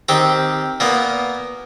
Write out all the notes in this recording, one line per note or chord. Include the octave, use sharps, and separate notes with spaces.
D#3 C4 G4
A#2 A#3 B3